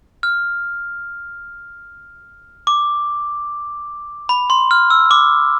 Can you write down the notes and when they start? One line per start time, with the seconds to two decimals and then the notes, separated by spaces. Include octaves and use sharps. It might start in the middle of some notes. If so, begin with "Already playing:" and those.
0.23 F6
2.67 D6
4.29 B5
4.50 C6
4.71 F6
4.90 E6
5.11 D6